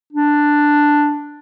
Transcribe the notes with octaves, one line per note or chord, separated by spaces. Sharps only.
D4